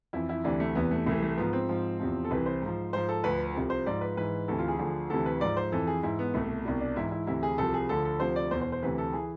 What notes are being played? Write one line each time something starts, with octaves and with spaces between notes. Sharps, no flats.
F2 E3 E4
E4
D2 C3 E3 D4
A3
E2 C3 E3 B3
A3
C2 C3 E3 A3
A3
G#2 F3 B3
C4
G#2 F3
E2 C3 F3
A4
C2 C3 E3 B4
C5
G#2 F3
G#2 F3 C5
A4
D2 D3 F3 B4
C2 C3 F3
C5
G#2 F3 D5
B4
G#2 E3 B4
D2 C3 E3 A4
F4
G#4
D2 D3 F3
D2 C3 E3 A4
B4
G#2 F3 D5
C5
F2 E3 A4
G#4
G#2 E3 E4
B3
C2 B2 A3
C2 B2 D4
D4
G#2 E3 E4
E4
D2 C3 E3 E4
G#4
C2 C3 F3 A4
G#4
D2 D3 F3 A4
A4
D2 C3 F3 C5
D5
E2 B2 C5
C5
C5
D2 C3 E3 B4
A4
E3 G#4